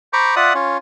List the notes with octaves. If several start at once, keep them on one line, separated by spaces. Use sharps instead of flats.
C5 A#5 B5 C#6 D6
F4 D5 E5 F#5 D#6 F#6
C#4 F4